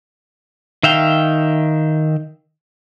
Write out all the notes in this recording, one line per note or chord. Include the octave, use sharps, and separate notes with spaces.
D#3 E5 F5 G5